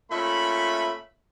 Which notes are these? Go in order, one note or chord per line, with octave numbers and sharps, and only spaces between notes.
A#2 A3 C#4 E5 B5